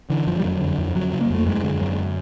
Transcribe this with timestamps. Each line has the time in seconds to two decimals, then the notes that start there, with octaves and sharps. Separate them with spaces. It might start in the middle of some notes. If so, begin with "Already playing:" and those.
0.10 D3 E3
0.27 F#2 F3
0.40 G3
0.44 F2 F#3
0.61 D3
0.78 F2
0.95 F2 F#3
1.13 C#3
1.21 A#3
1.30 F2 A3
1.46 F#2 G#3
1.64 D3
1.81 F#2